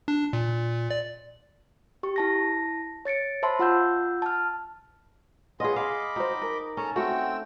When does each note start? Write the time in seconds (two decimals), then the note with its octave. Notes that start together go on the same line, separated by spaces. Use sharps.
0.08 D4
0.33 A#2
0.91 D5
2.03 G4 C#6
2.16 E4 A5 A#6
3.05 C#5 A6 C#7 D7
3.43 C5 E5 A5 B5 C6
3.59 F4 F#5 E6 G6
4.22 A5 F6
5.60 B3 C#4 F4 G#4 D#5
5.76 D#5 F5 B5 D6
6.16 D#4 F#4 C5
6.42 A#4
6.77 C#4 A4 A5 A#5
6.96 A3 C4 F#4 G5 E6